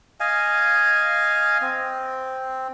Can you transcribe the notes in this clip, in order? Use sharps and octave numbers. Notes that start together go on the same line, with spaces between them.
D#5 F5 G#5
C4